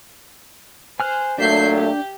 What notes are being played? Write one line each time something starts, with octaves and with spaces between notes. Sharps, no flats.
C5 G#5 F6 F#6
A#2 F#3 A3 D4 E5 G6 C7
G4